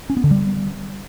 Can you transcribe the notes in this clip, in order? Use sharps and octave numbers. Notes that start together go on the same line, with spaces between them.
C#4
B3
D3
G3